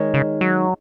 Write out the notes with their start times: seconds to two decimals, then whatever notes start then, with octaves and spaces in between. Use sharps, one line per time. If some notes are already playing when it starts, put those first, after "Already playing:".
Already playing: D#3 G#3 D#4 G#4 C#5
0.14 C#3
0.41 F#3